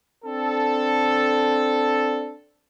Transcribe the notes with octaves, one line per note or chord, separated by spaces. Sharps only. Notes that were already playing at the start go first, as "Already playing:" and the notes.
C4 D4 A4